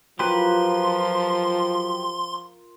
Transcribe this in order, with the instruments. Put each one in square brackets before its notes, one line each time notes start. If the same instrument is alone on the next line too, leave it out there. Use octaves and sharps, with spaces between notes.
[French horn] F3 [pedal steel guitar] F#3 G4 B4 [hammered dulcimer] F4 A#4 [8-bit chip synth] C6